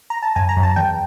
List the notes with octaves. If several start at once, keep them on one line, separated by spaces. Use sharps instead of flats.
A#5
A5
F#2 G#5
A#5
F#2
A5
E2 G5